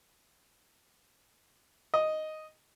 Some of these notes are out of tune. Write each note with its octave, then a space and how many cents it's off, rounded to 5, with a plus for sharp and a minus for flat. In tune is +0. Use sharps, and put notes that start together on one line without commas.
D#5 +0